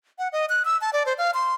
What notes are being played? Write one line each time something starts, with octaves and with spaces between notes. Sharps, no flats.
F#5
D#5
F#6
E6
A5
D5
C5
F5
C6